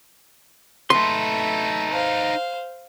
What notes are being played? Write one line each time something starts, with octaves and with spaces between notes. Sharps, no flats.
A3 D#4 B4 E5 C6
C5 F5